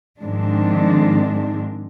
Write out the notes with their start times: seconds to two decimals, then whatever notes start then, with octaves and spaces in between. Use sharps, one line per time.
0.21 G#2 D#3 F3 G#3 C4 D4